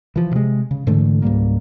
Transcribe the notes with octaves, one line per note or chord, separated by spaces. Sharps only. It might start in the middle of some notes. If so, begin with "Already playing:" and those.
E3 F3
C3 G#3
C#3
G#2 D3 E3 A3
C#2 G#2 G3 A#3